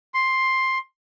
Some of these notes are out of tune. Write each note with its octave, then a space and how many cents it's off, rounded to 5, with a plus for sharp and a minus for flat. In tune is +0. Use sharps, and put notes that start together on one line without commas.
C6 +10